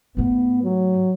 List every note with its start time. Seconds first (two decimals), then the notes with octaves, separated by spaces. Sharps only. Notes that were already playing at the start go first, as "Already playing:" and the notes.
0.17 G#2 A3 B3
0.63 F#3